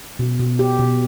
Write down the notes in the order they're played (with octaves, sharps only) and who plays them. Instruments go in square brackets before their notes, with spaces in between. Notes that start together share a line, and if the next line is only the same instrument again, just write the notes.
[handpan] B2
B2
G4
B2